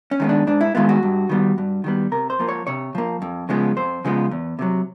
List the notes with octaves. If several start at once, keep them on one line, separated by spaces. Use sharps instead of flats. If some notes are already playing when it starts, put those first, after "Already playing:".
C#4
D#3 G#3 B3 D#4
D4
G#2 D4
E4
D#3 G#3 B3 F4
F#4
G2
D#3 G3 B3
G2
D#3 G3 B3
C3 A#4
C5
F3 A#3
C#5
C3 C#5
F3 A#3
F2
C#3 F3 G#3 B3
F2 C5
C#3 F3 G#3 B3
E2
C3 D#3 F#3